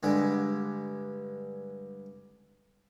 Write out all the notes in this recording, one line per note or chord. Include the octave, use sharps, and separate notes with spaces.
G2 D3 G#3